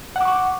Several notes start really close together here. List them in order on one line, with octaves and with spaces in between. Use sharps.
F#5 D6 C#6